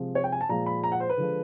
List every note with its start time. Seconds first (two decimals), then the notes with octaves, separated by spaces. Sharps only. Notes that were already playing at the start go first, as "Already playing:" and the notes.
Already playing: C3 F3 G#3
0.15 C#5
0.24 G5
0.32 G#5
0.41 A5
0.49 A#2 F3 G#3 A#5
0.66 B5
0.84 A#5
0.92 F#5
1.00 C5
1.10 B4
1.17 D3 F3 G#3